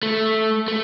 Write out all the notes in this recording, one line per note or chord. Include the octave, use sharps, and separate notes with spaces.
A3
A3